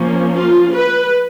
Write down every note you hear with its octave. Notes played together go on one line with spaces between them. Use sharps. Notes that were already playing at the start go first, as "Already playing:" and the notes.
Already playing: F3 A#3 C#4
F4
B4